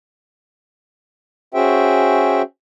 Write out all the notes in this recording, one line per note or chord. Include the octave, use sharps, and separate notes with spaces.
C#4 F#4 G#4 C5 E5 G5